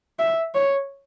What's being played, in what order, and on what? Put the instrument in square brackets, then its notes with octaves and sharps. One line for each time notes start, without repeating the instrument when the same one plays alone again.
[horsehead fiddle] E5
C#5